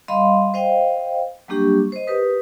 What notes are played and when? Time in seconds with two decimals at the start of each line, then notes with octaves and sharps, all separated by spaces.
0.08 G3 D#5 F5 B5 C6
0.54 C5 D#5 F5 G5
1.48 F#3 G3 A#3 D4 G4 C#6
1.92 C5 D#5
2.07 G4 A#4 B4 D#6